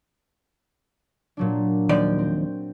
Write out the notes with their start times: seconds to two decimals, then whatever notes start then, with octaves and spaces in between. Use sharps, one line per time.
1.37 A#2 F#3 D4
1.89 D#2 F3 D5 G6
2.19 C4